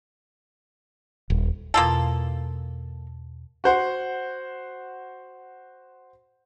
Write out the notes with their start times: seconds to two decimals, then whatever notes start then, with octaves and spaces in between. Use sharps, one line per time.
1.30 D#1
1.74 E2 B2 A#3 F4 A4
3.64 F#4 C5 F#5